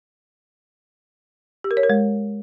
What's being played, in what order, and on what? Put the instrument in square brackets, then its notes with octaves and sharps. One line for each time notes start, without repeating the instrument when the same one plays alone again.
[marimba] G4
A#4
C#5
A#4
G#3